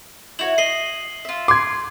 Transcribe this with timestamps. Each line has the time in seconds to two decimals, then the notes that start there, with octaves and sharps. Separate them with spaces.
0.39 E4 F#4 C#5 F#7
0.58 D#5 C7 F#7 G7
1.25 F4 E5
1.48 C6 D6 G#6